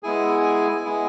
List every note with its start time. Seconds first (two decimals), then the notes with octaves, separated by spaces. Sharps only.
0.03 G#3 B3 E4 G#4 G#5
0.84 G#3 B3 E4 G#4